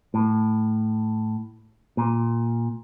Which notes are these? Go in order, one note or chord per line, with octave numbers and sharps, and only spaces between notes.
A2
A#2